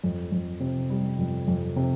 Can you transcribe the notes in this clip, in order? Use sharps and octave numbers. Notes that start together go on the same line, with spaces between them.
F2
F2
C3
G3
F2
F2
C3